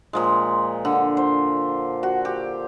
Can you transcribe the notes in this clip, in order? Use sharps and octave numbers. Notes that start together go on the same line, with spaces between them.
A#2 F3 G#3
D3
C5
F#4
G4